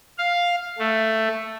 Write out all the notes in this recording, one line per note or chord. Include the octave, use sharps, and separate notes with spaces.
F5
A3